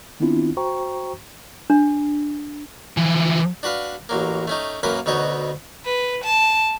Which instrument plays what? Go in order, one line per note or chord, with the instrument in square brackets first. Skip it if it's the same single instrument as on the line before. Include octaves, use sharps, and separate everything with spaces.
[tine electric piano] D#3 B3 C4 D4 E4 F4
F#4 C5 G5 A#5 C#6
[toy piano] D4
[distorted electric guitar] E3 F3
[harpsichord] D4 F#4 B4 F5
A1 F#3 A#3
A3 C#4 D#4
F#2 A#3 C#4 B4 B5
D2 B2 D#4 F#4 C#5
[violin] B4
A5